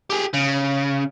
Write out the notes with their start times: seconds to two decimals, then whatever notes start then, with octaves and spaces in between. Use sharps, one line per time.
0.10 G4 G#4
0.34 C#3